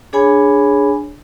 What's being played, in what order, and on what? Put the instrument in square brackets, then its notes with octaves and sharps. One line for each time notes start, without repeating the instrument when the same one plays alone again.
[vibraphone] D4 G#4 C#5 G#5 B5